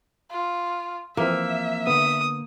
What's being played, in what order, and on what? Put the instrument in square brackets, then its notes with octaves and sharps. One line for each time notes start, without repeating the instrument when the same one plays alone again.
[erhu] F4
[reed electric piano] E3 F3 C4 [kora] A#3 [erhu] E5
[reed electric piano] D3 B3 [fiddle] D#6